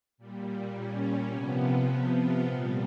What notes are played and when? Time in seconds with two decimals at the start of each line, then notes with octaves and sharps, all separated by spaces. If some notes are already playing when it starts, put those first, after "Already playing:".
0.18 A#2 G3
0.74 C#4
1.30 C3 F3 B3
2.15 F4
2.42 A#2 G3